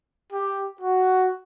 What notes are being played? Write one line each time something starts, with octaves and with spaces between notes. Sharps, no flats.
G4
F#4